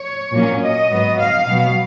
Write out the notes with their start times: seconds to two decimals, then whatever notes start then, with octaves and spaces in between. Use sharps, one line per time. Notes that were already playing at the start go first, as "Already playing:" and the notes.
Already playing: C#5
0.33 A#2 F#3 A#3 C#4
0.62 D#5
0.90 G#2 F#3 B3
1.18 F5
1.48 B2 F#3 B3